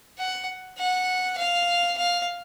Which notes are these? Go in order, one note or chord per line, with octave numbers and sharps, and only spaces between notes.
F#5
F#5
F5
F5